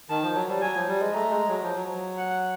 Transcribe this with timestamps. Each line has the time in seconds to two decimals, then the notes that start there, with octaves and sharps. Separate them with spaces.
0.09 D#3 A5
0.23 F3
0.35 F#3
0.48 G3
0.61 F#3 G#5
0.74 F3
0.87 G3
1.00 G#3
1.13 A3 A#5
1.31 G#3
1.48 F#3
1.62 F3
1.75 F#3
2.17 F#5